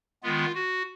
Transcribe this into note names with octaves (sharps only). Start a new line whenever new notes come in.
D#3 G#3 B3 F4
F#4